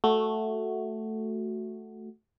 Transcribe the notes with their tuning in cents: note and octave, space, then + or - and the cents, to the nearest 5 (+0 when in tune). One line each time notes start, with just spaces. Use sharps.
A3 +0 F#4 +0